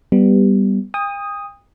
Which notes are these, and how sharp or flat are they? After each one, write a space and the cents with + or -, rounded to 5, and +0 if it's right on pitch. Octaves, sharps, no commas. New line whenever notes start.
G3 +0 B3 +0
G5 +45 D#6 +0